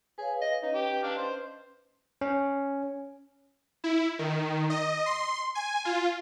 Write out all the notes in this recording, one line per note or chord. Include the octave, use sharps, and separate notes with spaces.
G#4 B4 C#5 F5
D#5
C#4 D#4 B4 D#5
G4
D4 F5
C5
C#4
E4
D#3
D#5
C6
G#5
F4